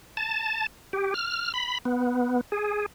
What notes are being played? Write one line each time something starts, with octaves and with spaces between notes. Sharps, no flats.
A5
G4
F6
B5
B3
G#4